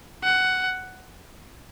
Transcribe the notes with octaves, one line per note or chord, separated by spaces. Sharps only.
F#5